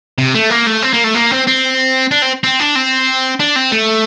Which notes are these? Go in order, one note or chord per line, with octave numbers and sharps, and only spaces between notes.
C3
A3
A#3
A3
C4
A#3
A3
A#3
C4
C4
D4
C4
C4
D4
C4
D4
C4
A3